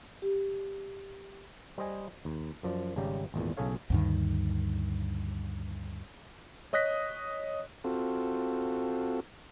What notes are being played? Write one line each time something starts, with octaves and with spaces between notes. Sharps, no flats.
G4
G3 C5 D#5 G#5
D#2
F#2 F3 D5
G#1 C#3 G3 G4 A#5
G#1 E2 A#2
B1 C#3 G#4 A4 C#5 F5
D2 G2 D#3
C#5 D#5 D#6 F#6 A#6 B6
C4 F4 F#4 A4